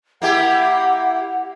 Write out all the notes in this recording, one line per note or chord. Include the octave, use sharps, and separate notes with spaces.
A#3 E4 G4 F#5